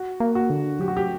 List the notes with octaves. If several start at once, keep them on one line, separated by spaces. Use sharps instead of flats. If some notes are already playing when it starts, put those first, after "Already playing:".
Already playing: F#4
A#3
F#4
D3
F#3 G4
F#4
G4